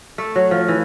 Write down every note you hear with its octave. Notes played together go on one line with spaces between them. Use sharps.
A3
F#3
F3
E3